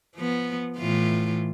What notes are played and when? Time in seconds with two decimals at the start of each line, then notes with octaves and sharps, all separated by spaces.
0.15 F3 B3
0.77 A2 E3 F4